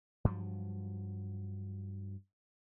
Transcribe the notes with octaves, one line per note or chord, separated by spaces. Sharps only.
G2 F3 F#3